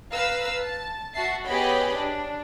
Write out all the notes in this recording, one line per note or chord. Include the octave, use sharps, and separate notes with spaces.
B4 F5 A#5 E6
A5
F#4 E5 A5 C7
B3 G4 G#4 C#5 D#5 B5
D4